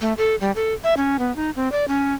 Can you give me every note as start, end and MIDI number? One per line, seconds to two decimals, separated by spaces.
0.01 0.13 57
0.18 0.35 69
0.41 0.51 55
0.56 0.73 69
0.84 0.94 76
0.97 1.17 61
1.19 1.34 59
1.36 1.50 63
1.56 1.71 60
1.72 1.85 74
1.88 2.14 61